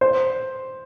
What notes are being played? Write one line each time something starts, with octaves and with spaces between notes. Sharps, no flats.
C5